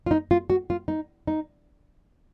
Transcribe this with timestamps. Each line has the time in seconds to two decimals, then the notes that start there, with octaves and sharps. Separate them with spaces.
0.06 F4
0.11 D#4
0.31 F4
0.50 F#4
0.70 F4
0.88 D#4
1.27 D#4